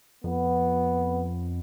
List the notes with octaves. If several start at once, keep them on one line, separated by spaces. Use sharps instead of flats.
F2 B3